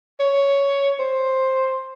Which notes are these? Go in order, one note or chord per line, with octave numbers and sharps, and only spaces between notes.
C#5
C5